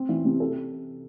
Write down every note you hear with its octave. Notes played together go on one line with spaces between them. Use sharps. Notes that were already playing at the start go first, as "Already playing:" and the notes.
Already playing: C4
E3
C3
A4